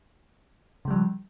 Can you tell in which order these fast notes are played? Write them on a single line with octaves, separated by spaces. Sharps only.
C#3 G#3 G3 F3